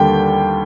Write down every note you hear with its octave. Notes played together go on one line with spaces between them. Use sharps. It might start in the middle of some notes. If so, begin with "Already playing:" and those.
Already playing: D#2 D3 G3 A#3 G5